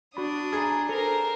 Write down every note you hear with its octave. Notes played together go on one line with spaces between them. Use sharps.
D4 F#4 B5 D#6
G#4 G#5 A#5
A4 A#4 C5